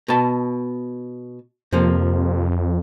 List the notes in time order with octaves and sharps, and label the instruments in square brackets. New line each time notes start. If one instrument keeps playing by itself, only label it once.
[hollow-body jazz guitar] B2 A5
[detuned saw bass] F2 [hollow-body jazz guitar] C3 F3 A#3